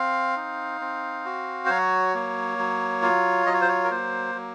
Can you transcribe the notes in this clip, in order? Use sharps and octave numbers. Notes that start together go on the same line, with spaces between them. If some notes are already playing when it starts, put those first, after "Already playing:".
Already playing: C4 F5
D#4
C4
F#4
C5
F#3 C#5
A#3
F#3
F4
F#3 D#5
C#5
C5
C#5
A#4
A#3 C5
F#3